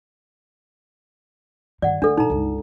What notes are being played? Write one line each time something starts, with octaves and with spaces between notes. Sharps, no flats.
G2 D#3 D5 F#5
D2 D4 A4
A#1 D#4 A#5
G1 C#2